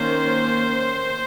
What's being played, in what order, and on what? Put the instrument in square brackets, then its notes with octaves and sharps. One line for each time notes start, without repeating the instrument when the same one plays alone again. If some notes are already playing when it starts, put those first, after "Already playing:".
Already playing: [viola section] D#3 A#3 C#4 C5